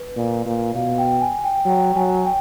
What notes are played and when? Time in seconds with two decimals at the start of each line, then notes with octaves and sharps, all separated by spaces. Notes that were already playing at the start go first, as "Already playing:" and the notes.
Already playing: B4
0.16 A#2
0.46 A#2
0.75 B2 F5
0.98 G5
1.21 G#5
1.44 G5
1.65 F#3 G5
1.96 F#3 G#5
2.25 G5